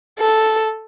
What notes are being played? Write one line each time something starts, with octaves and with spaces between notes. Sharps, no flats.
A4